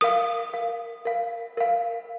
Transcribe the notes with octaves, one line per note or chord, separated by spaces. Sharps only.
A#4 F5 D#6
A#4 F5
A#4 F5
A#4 F5